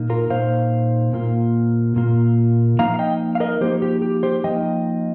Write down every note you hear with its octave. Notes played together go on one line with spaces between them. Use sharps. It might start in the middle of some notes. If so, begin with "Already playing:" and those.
Already playing: A#2 A#3 D#4
F4 A#4
A#2 A#3 D#4 C5 F5
A#2 A#3 F4
A#2 A#3 F4
F3 A#3 D#4 F5 A#5
F5
D#5 G5
F5
A#4 D#5
F3 A#3 D#4 G4 C5
G4
G4
G4 C5
F3 A#3 D#4 D#5 G5